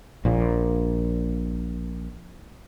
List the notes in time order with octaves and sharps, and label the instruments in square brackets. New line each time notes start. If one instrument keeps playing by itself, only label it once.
[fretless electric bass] A#1 A#2